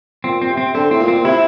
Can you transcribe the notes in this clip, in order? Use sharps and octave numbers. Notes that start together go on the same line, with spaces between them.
A#2 C4
C4
C3
C4
D3 C4
A2 C4
A#2
C4
A#2
C3 E4